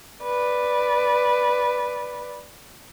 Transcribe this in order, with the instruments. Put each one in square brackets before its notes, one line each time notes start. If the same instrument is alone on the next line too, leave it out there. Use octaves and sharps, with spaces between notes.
[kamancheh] B4 D5